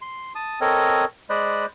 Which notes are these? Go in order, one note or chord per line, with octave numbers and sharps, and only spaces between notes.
C6
A5 D#6
C4 A4 A#4 C#5 D#5
G#3 C5 D5 D#5 B5 F#6